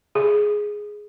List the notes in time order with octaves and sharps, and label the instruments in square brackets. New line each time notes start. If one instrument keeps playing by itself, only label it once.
[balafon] G#4